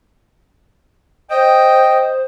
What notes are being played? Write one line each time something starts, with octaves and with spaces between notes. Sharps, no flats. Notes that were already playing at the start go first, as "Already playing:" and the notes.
C5 D#5 G5